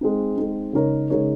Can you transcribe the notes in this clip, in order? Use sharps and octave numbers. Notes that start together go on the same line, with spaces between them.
G#3 C4 D#4
G#3 C4 D#4
C#3 G#3 D#4 A#4 C#5
C#3 G#3 D#4 A#4 C#5